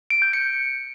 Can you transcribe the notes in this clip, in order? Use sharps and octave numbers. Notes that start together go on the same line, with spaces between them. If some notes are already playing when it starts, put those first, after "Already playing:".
D7
G6
C#7